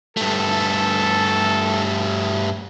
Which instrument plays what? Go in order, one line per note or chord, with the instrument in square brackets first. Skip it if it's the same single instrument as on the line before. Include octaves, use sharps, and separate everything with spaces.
[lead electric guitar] G2 A3 [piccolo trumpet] A4